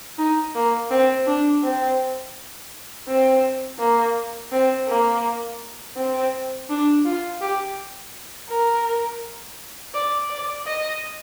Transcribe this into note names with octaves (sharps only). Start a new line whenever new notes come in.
D#4
A#3
C4
D4
C4
C4
A#3
C4
A#3
C4
D4
F4
G4
A#4
D5
D5
D#5